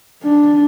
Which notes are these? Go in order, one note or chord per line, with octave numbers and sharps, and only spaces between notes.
D4